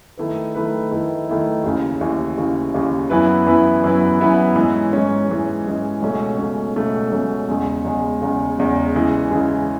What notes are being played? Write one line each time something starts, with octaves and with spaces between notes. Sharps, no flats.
D#3 A3 E4 B4
D#3 A3 E4 B4
D#3 A3 E4 B4
D#3 A3 E4 B4
D#2 C#3 E3
D#2 C#3 E3
D#2 C#3 E3
D#2 C#3 E3
F#2 E3 B3 E4 B4
F#2 E3 B3 E4 B4
F#2 E3 B3 E4 B4
F#2 E3 B3 E4 B4
G#2 E3 G#3 C#4
G#2 E3 G#3 C#4
G#2 E3 G#3 C#4
G#2 E3 G#3 C#4
C#2 B2 A3 C#4
C#2 B2 A3 C#4
C#2 B2 A3 C#4
C#2 B2 A3 C#4
E2 C#3 G#3
E2 C#3 G#3
E2 C#3 G#3
E2 C#3 G#3
C#3 E3 G#3
C#3 E3 G#3